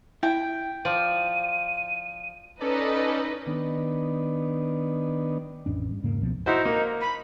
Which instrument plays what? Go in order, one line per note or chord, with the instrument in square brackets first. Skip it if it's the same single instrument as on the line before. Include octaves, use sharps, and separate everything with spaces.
[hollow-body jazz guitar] E4 [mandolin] G5
[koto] F3 D5 [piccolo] D#7
[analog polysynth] C#4 A4 D5 [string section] D#4 B4 D#5
[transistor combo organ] D#3 B3 D4
[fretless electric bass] A1 F2 C#4 D4
G2
E1 G#2 C#3 A#3
C#2 B2 F3 B3
[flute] D#4 [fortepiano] E4 F#4 C5
[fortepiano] A#3
[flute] B5